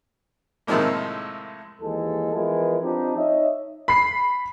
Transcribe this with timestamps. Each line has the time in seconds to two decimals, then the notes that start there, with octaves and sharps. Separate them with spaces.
0.67 A2 C3 D#3 F3 G#3 A#3
1.82 D#2 E3 G#3 A4
2.33 E3 F3 G#3 B3 E4 A#4
2.83 F3 C4 D4 D#4 G4 D#5
3.16 D#4 C#5 D#5 E5
3.88 B5 C7